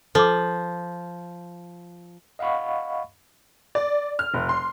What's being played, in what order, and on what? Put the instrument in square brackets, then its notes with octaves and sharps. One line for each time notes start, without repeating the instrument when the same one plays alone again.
[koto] F3 [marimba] A4 D6
[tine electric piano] D#5 F5 F#5 B5 C#6
[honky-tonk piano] D5
F6
F1
C6